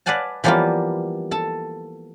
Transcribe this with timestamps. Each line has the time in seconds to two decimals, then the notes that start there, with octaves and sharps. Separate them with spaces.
0.06 B4 D5 F5 F#5 G#5 A5
0.44 E3 F3 G3 A#3 B3 F4
1.31 A4 A5